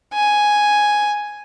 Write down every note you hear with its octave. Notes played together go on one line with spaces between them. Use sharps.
G#5